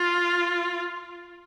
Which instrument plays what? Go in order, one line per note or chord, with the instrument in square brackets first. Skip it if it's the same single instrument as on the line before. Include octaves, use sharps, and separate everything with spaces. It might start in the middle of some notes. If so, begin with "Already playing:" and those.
Already playing: [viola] F4